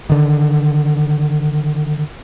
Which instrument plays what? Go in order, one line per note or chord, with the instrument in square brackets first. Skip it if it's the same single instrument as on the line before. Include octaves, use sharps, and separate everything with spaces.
[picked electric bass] D3 D#3